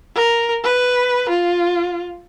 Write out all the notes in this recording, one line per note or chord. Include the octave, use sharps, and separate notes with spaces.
A#4
B4
F4